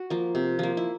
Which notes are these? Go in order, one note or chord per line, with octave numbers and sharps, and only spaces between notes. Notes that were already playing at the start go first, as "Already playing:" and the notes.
Already playing: F#4
F3 A#3
C3
F3 A#3
E4